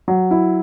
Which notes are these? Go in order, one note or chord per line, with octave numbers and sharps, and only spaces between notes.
F#3
E4